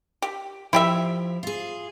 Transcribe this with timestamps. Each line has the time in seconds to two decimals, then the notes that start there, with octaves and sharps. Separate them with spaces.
0.22 G4
0.73 F3 E4 G4 E5
1.43 F4 G#4